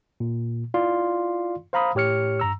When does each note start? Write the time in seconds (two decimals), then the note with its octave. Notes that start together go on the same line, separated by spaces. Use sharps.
0.20 A#2
0.74 E4 F4 D5 F5 C6
1.73 C5 F5 A#5 B5 D#6
1.95 A2 G4 C#5 F6 C#7
2.40 G2 A#5 E6